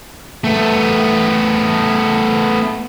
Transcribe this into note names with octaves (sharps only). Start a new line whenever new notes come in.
A3 B3